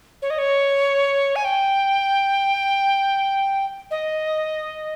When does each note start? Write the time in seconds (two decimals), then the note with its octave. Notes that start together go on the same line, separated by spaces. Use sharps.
0.22 C#5
0.30 D#5
0.39 C#5
1.36 G#5
1.45 G5
3.91 D#5